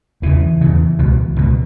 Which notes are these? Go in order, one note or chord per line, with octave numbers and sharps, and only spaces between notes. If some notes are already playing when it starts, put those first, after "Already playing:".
E2 C#3 E3
E2 C#3
C#2 B2
C#2 B2